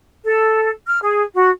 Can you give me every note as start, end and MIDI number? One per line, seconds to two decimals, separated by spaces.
0.23 0.70 69
0.86 0.98 89
1.02 1.22 68
1.33 1.49 66